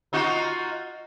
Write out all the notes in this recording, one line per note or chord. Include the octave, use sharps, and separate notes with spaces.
D#4 F4 F#4